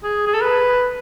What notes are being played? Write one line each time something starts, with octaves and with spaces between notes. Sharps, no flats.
G#4
G#4
A4
B4